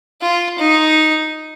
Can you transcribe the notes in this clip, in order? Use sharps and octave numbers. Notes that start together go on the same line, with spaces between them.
F4
D#4